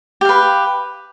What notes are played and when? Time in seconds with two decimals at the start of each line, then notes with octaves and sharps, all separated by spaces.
0.21 G4
0.25 F5
0.29 B4